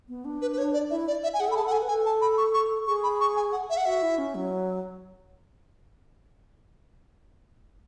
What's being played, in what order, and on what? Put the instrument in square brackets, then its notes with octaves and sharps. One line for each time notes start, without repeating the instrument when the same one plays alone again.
[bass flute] B3
D4
[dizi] B4
B4
C#5
D5
[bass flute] E4 [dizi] E5
[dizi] D5
E5
G#5
[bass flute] G#4 [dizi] F#5
[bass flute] A4
[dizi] B5
[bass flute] G#4 [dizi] A5
[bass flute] A4 [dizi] F#5
[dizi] G#5
[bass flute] B4
[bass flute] A4 [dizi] G#5
[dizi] A5
B5
C#6
C#6
[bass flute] G#4 [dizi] C#6
[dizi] B5
C#6
G#5
F#5
E5
F#5
[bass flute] F#4 [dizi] E5
[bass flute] E4
C#4
F#3